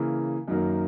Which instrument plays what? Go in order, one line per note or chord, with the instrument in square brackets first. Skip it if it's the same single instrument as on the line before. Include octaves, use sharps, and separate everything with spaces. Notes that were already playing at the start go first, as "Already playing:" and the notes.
Already playing: [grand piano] C#3 E3 A#3
F#2 D#3 F#3 A#3